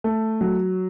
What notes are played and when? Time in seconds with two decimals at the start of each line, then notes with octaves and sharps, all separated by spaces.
0.04 A3
0.41 F#3